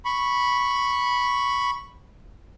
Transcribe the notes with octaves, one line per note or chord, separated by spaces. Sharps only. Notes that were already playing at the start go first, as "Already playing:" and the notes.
B5 C#6